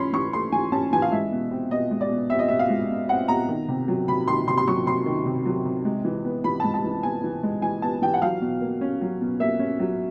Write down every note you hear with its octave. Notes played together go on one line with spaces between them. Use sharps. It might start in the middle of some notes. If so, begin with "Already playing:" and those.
Already playing: E3 A3 C#4 B5 C6
E3 C#6
A3 C6
E3 G#5
C#4 A5
E3 G#5
F5
G#3 E5
B2
C4
B2 D#5
G#3
D5
B2
C4 E5
D#5
B2 E5
F5
G#3
B2
C4 F#5
B2 A#5
D#3
C3
F#3
C3 B5
D#3 C6
C3 C6
C6
F#3 C#6
C3 C6
D#3
C3
F#3
C3
G#3
E3
B3
E3 B5
G#3 A5
A5
E3
B3 G#5
E3
G#3
E3 G#5
B3 A5
E3 G5
F#5
F#3 F5
B2
A#3
C#4
F#3
B2
A#3 E5
C#4
F#3